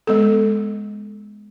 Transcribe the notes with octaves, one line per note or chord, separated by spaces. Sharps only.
G#3 B3 A4